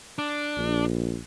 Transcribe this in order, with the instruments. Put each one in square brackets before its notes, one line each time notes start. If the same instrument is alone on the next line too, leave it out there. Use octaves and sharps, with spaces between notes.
[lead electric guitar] D4
[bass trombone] A#1